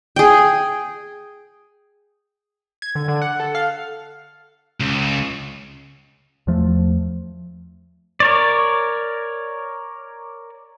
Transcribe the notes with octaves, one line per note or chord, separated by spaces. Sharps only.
G#4 G5
G#6
D3
D3
F#5
A4
F5
C#2
E2 F3 A3
A#4 C#5 D5